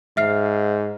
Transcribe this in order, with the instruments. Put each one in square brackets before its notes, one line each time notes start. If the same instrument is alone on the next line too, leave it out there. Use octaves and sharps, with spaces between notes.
[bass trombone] G#2 [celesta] E5 F6 C7